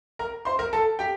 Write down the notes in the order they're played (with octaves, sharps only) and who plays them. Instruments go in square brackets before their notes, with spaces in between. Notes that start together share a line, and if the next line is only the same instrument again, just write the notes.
[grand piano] A#4 A#5
C5 C6
A#4 A#5
A4 A5
G4 G5